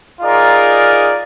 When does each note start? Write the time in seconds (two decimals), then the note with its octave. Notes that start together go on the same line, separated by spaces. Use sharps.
0.22 D#4 F4 G#4 A#4 D5